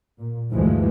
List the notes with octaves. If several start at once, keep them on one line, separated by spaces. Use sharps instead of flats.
A#2
D2 G2 E3 F3 G#3